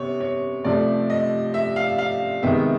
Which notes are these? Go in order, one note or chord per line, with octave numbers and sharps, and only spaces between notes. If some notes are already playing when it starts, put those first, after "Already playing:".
Already playing: C3 B3 C#5
C#5
C3 F3 A3 D5
D#5
E5
F5
F5
C3 D#3 G#3 B3 E5